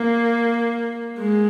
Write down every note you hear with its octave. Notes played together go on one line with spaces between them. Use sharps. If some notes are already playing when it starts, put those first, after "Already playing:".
Already playing: A#3
G#3